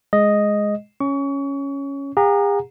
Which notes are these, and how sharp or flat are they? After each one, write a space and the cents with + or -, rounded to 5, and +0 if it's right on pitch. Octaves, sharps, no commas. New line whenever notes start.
G#3 +0 D#5 +0
C#4 +0 C#6 +30
G#4 -45 F#5 -35 A#5 +0